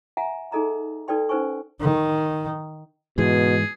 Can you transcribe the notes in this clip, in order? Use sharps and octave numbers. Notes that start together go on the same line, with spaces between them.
E5 F#5 G#5 A#5
D#4 G#4 A4 D#5 A#5 B5
D#4 A4 B4 D5 G5 C6
C#4 D#4 B4 C5 G#5 C#6
D#3
G#2 B2 E3 G#3 G#4